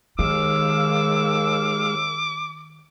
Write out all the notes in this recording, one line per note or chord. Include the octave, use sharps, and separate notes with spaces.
D#2 D#3 G#3 F5 D6 E6